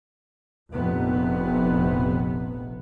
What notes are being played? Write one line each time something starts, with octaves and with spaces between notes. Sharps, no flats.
F1 A#1 F2 C3 B3